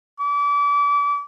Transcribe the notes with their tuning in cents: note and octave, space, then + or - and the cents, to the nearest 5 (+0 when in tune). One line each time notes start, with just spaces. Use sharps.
D6 -35